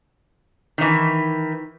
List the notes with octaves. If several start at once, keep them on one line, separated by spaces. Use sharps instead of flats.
D#3 E3